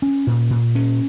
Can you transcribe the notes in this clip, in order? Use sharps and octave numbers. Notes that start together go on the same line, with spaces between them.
C#4
A#2
A#2
C#4